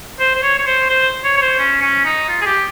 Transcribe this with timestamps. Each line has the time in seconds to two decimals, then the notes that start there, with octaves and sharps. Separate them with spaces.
0.20 C5
0.36 C5
0.43 C#5
0.59 C#5
0.67 C5
0.89 C5
1.24 C#5
1.37 C#5
1.42 C5
1.59 C#4
1.82 C#4
2.05 D#4
2.29 F4
2.41 G#4
2.46 G4